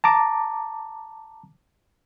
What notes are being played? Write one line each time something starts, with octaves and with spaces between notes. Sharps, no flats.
A5 A#5 D6